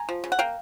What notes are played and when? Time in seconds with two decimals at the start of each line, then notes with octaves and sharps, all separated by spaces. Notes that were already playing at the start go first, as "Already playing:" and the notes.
Already playing: G#5 A#5
0.09 F3
0.24 C#3
0.32 F#5
0.39 A#3 F5 G5